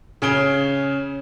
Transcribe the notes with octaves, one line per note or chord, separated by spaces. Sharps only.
C#3 C#4 G#4 D7 G7